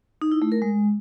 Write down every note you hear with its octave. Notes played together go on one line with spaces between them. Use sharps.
D#4
E4
A3
A#4
G#3